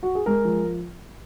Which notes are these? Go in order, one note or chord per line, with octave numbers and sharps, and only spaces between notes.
F#4
G#4
G#3 A#4
F3